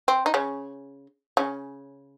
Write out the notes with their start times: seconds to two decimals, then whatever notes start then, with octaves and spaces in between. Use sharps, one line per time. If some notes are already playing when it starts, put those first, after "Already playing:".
0.08 C4
0.26 D#4
0.34 C#3 C#4
1.37 C#3 C#4